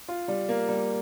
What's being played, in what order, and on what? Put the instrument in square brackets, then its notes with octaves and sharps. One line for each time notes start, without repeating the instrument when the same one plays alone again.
[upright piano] F4
G3
A#3
G3